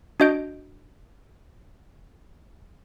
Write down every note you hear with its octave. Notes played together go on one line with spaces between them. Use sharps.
D4 F#4 D#5 G6 D7